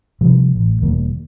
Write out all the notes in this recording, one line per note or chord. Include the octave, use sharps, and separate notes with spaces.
C3 F3 G3
A1
E1 D#3 G3 A#3